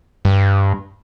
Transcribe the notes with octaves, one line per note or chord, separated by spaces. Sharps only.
G2